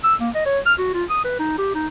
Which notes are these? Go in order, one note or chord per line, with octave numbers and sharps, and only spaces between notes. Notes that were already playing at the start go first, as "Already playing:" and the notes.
E6
A#3
D#5
C#5
F6
F#4
F4
D#6
B4
D#4
G4
D#4